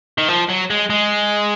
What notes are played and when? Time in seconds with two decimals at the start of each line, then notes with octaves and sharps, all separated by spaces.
0.18 D#3
0.28 F3
0.49 F#3
0.70 G#3
0.90 G#3